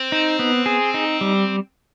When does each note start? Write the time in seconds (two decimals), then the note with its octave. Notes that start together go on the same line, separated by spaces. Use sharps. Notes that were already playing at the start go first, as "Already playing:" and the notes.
Already playing: C4
0.12 D#4
0.39 B3
0.66 G#4
0.94 D#4
1.21 G3